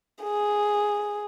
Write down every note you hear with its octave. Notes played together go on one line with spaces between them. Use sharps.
G#4